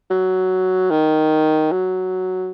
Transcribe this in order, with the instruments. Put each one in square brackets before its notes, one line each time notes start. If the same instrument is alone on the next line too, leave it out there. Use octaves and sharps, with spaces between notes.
[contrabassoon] F#3
D#3
F#3